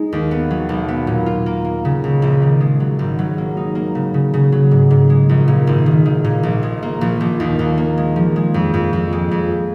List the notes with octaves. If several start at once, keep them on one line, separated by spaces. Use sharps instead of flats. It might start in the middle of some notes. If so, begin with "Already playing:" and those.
Already playing: G#3 D#4
D#2
B3
F#3
B1
B3
A#2
F4
A#3
A#3
C#3
C#2
A#1
D#3
G#3
F#3
G#1
F#3
A#3
D#4
A#3
C#3
C#3
C#3
F#3
G#2
G#2
G#3
A#1
A#2
G#1
D#3
D#3
A#2
A#1
G#3
A#3
A#1
A#1
D#2
D#2
A#3
G#3
F3
G#3
F2
F2
F2
G#3
F2